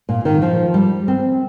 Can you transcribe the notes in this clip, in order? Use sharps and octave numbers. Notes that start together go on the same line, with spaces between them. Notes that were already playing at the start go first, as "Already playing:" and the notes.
A#2
D#3
F3
G3
C4